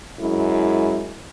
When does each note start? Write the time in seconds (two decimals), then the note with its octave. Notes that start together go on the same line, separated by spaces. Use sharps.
0.20 F#2 G#3 E4